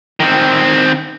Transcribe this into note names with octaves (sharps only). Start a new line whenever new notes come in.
D#3 C4